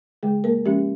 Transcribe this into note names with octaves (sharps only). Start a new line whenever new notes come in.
C#3 G#3 G#4
A#3 A#4
F3 G#3 C#4 G4